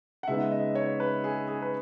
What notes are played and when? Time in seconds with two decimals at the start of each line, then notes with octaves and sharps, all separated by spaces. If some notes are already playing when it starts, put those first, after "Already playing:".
0.23 F#5
0.28 C#3 G#3 B3 D#4 E5
0.52 D#5
0.75 C#5
1.00 B4
1.24 G#4
1.48 G#4
1.62 B4